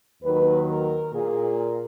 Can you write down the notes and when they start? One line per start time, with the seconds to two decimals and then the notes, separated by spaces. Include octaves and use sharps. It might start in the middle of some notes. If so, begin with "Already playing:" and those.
0.23 D#2 D#3 F#3 B4
0.69 A#4
1.13 A#2 A#3 G#4